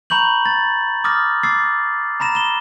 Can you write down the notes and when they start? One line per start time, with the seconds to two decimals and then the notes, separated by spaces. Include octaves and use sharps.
0.10 A#5 B5 C#6 G6 F#7
0.45 A6
1.04 D6 D#6 F6 A6 A#6
1.43 D6 E6 A6 C7
2.20 A#5 B5 A#6 E7
2.35 E7 G7